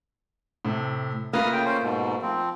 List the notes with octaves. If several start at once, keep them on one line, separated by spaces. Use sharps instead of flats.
A2 C3
A3 A#3 F4 B4 D#6 F6
C#3 G5
C#4 C5
G#2 B2
F3 C4